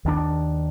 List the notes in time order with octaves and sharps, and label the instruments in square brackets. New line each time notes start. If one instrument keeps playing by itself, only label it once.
[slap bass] D#2 D#3 A#3 D4